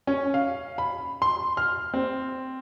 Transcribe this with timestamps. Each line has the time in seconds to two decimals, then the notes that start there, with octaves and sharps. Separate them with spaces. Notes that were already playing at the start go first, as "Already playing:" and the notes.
0.07 C#4
0.34 F5
0.78 B5
1.22 C6
1.57 F6
1.94 C4